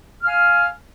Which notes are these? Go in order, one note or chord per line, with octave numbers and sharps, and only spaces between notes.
F5 G#5 F6